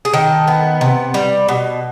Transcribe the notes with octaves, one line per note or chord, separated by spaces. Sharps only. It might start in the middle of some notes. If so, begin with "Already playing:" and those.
G#4
D#3 A4
B3
C3
G3
B2